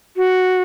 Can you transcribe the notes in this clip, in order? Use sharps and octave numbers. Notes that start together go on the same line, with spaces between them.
F#4